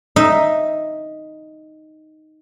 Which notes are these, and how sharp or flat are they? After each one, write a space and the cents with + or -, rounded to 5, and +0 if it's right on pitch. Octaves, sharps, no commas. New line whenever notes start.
D#4 +0 E5 +0